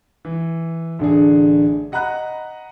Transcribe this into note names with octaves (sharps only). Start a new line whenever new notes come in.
E3
A1 D3 D4 G#4
D#5 F#5 A#5 B5 F#6